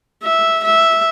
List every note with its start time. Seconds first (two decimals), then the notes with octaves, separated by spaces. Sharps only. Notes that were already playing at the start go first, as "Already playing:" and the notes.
0.23 E5
0.65 E5